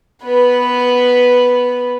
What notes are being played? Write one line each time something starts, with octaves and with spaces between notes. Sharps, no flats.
B3 B4